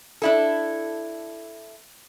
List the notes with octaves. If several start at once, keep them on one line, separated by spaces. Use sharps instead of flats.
D4 E4 A4